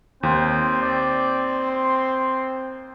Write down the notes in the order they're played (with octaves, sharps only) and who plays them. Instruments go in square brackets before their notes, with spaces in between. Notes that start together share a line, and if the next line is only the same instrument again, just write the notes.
[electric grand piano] D#2 [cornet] C4 [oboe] C5
[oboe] D5
C6